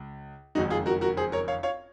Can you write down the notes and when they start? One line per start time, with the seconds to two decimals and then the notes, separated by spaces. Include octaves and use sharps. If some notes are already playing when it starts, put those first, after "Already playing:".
Already playing: C#2
0.55 F#1 F2 D#3 G#3 D#4 F#4
0.70 F4 G#4
0.86 F#4 A#4
1.01 F#4 A#4
1.17 G#4 C5
1.32 A#4 C#5
1.48 C#5 F5
1.63 C#5 F5